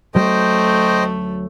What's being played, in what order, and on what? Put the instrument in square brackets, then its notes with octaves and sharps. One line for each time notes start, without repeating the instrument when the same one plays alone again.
[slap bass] D2 F#3 C#4 [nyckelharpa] A3 [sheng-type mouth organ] C5 D#5 G5